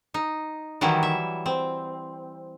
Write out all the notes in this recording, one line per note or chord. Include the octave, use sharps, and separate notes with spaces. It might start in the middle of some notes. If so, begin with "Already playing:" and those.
D#4
D#3 E3 F#3 G3 E4
E5
C4